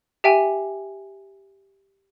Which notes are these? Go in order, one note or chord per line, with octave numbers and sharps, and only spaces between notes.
G4 E5 G5 G#5